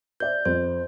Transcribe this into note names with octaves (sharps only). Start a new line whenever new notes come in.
C5 D5 E5 G6
F2 C5